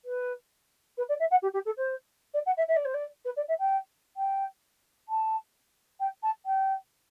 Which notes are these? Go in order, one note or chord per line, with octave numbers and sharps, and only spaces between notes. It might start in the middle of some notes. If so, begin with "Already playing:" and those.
B4
B4
D5
E5
F#5
G4
G4
A4
C5
D5
F#5
E5
E5
D5
C5
D5
B4
D5
E5
G5
G5
A5
G5
A5
G5